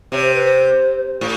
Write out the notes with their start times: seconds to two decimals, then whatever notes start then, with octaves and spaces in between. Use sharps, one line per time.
0.12 C3 C#5
0.24 C5
0.34 B4
0.46 C5
1.21 A2